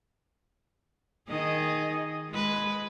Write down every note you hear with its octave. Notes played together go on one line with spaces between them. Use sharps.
D#3 G#4 D#5
G#3 B4